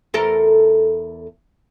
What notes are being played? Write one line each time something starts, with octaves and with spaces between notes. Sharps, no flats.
E2 A4 A#4